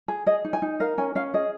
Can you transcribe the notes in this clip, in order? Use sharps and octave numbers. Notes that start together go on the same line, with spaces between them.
G#4
G#4 D#5
D#4
G#5
D#4
A#4 F5
C#4 G#5
C#4 F5
G#4 D#5